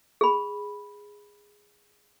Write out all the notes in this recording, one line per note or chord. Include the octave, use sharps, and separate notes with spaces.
G#4 B5